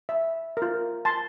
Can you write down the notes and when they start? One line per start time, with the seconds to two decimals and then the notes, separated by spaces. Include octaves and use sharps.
0.09 E5
0.57 F4 A#4
1.05 A5 C6